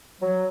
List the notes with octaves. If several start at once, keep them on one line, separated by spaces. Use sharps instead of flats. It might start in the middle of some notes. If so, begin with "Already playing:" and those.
F#3